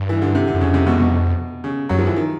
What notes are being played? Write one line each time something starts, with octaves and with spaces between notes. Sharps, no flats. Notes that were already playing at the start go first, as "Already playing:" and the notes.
Already playing: G2
E3
D3
C3
D3
F#2
F2 C#3
C3
B2
B2
C#3
F#2 F#3
F3
E3
D#3